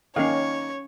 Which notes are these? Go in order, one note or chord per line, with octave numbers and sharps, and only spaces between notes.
D#3 A#3 C#4 D#4 C#5 F5